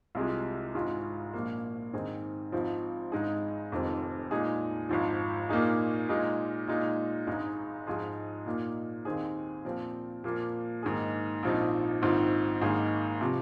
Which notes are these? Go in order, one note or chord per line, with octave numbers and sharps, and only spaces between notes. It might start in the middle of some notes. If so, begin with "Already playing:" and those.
C2 C3 G#3 F4 G#4
G#1 G#2 G#3 F4
A#1 A#2 F3 A#3
G#2 D#3 C4 G#4
G#1 G#2 F3 C4
G#1 G#2 G#3 D#4 G#4
F1 F2 D#3 C4
A#2 G#3 D#4 G#4
G#1 G#2 F3
A#2 A#3 D#4 G#4
A#2 G#3 D#4
A#2 G#3 D#4
G#1 G#2 G#3 D#4 G#4
G#2 F3 G#3 F4 G#4
A#2 A#3 D#4
D#2 D#3 C4 G#4
A#2 F3 C4
A#2 F3 A#3
G#2 D#3 A#3 G#4
A#1 A#2 F3 C4 D#4
A#1 G#2 D#3 C4 F4
G#1 G#2 D#3 A#3 G#4
C3 F3